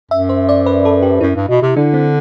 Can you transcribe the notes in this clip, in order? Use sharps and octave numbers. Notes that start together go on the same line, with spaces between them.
F#2 E5
C5
D5
B4
A4
G4
F#2 E4
G2
B2
C3
D3 D4
C4